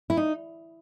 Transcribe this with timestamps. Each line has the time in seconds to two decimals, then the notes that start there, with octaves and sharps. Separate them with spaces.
0.10 E4
0.17 D#4